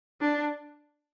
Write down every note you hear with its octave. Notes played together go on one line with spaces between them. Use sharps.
D4